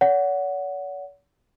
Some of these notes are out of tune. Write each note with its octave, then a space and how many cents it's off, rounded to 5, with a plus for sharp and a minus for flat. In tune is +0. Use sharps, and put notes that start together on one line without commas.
C#5 +45 F#5 +0